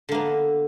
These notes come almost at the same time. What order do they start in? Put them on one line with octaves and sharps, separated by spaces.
D3 A#3 B3